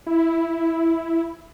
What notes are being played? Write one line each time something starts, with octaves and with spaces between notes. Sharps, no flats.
E4